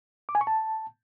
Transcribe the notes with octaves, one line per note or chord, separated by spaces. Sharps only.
D6
G#5
C#6
A5